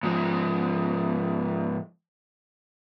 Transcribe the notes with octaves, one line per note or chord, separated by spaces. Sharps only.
G#2 F3